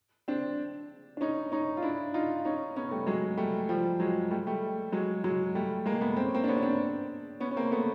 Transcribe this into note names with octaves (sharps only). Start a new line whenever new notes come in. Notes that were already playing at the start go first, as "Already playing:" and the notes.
C4 D4
D4
C#4 D#4
C#4 D#4
F4
D4 E4
D#4 F4
C#4 D#4
B3 C#4
G3 A3
F#3 G#3
G3 A3
F3 G3
F#3 G#3
G3 A3
G3 A3
F#3 G#3
F#3 G#3
G3 A3
G#3 A#3
A3 B3
C4
C#4
A#3 C4
D4
B3 C#4
C#4
C4 D4
B3 C#4
C#4
A#3 C4
A3 B3